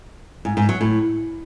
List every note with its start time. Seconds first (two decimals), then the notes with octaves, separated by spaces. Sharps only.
0.45 G#2
0.57 G#2
0.69 F#3
0.81 A2